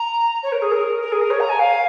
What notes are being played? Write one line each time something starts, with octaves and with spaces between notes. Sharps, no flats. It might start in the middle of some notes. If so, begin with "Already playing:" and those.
Already playing: A#5
C#5
A#4
G#4
A#4
A#4
G#4
A#4
C#5
A#5
G#5
F5